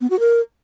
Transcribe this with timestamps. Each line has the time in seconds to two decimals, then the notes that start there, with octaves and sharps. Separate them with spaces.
0.01 B3
0.10 F#4
0.20 A#4